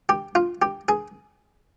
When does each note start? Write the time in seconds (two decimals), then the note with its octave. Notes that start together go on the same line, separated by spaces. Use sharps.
0.09 G4
0.35 F4
0.62 G4
0.88 G#4